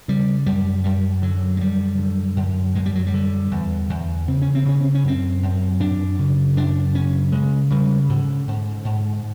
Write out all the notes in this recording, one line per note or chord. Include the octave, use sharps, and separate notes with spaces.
C#3 G3
F#2 G3
F#2 G3
D3 F#3
G#3
F#2 G3
D3
F#2
F#2 G#3
G3
F#3
G3
D3
E2
E2
C#3 C4
C#4
C4
C#3 C#4
C4
C#4
F#2 C4
F#2
F#2 D4
C#3
F#2 D4
C#3 C#4
C#3 G#3
C#3 G3
G#2 D3
G#2
G#2